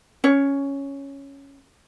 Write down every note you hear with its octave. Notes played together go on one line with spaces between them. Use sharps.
C#4 C#5